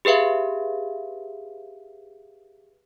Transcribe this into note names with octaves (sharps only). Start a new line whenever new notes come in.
G4 G#4 B4 E5 F5